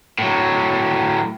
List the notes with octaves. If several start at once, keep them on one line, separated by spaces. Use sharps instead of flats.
A2 F#3